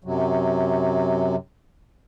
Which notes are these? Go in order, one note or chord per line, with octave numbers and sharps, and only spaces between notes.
F#2 C3 F#3